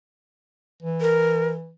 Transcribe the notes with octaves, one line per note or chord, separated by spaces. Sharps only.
E3
A#4